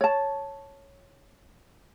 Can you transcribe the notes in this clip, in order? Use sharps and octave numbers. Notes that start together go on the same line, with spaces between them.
C#5 A5